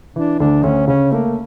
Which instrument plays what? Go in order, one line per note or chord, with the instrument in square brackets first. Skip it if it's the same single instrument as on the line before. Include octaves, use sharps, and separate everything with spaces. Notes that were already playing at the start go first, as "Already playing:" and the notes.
[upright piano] E3 [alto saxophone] D4
[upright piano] D2 [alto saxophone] D4
[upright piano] D2 [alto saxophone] C#4
[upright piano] C#3 [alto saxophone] C#4
[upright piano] A3 [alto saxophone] A#3